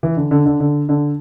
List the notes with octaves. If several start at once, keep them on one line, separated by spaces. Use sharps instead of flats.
E3
D3
D3
D3
D3
D3